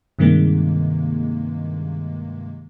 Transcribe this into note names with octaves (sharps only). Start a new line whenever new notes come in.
G2 C3 D#3 G#3 A#3